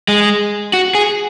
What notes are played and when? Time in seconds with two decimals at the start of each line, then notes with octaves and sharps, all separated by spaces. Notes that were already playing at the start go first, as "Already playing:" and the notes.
0.08 G#3
0.73 F#4
0.95 G#4